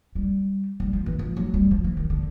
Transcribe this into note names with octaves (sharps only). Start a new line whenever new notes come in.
G3
G3
F3
E3
F3
F#3
G3
F3
E3
D#3
D3